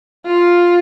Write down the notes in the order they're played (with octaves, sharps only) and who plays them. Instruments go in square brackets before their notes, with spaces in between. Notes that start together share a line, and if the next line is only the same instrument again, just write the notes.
[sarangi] F4